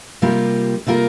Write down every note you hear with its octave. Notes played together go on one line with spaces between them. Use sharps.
C3 G3 A#3 F4 A#4
C3 G3 A#3 F4 A#4